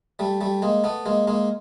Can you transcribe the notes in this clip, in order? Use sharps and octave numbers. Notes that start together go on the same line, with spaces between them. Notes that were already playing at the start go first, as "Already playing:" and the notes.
G3 A3
G3 A3
G#3 A#3
A3 B3
G#3 A#3
G#3 A#3